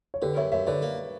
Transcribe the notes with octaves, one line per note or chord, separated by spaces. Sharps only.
C#5
D3 G4 B4
F#2 C#5 E5
F#2 C#5 E5
D3 B4 D5
A#3